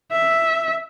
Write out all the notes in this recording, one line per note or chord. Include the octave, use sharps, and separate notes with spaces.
E5